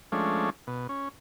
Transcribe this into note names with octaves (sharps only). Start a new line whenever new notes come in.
F3 G#3 A3 C#4 D4
B2
C#4